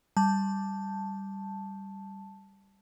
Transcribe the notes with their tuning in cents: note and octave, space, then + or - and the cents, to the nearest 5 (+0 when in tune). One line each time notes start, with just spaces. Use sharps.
G3 +0 A5 +0